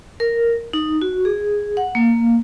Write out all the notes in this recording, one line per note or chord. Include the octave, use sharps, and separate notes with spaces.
A#4
D#4
F#4
G#4
F#5
A#3